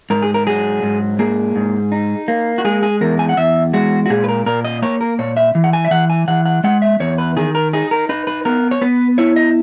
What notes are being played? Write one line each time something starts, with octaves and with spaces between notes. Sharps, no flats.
G#2 A#4
G#4
A#4
F#3 G#4
G#2
A#3 G#4
G#2
D#4
A#3
F#4
G#3 G#4
G#4
E2 A#4
G#5
F#5
E2 E5
G#3 F#4
F#4
A#2 G#4
B4
A#4
A#2 A#4
D#5
A#3 C#5
A#4
A#2 C#5
E5
E3
F#5
G#5
E5
E3 F#5
G#5
E3 F#5
F#5
G#3 F#5
E5
E2 C#5
B4
D#3 G#4
A#4
D#4 G#4
A#4
D#4 B4
B4
B3 A#4
C#5
B3 B4
E4 C#5
D#5